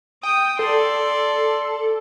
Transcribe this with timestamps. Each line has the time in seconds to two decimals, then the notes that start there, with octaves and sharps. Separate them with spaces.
0.23 G5 D#6
0.59 A4 D5 C6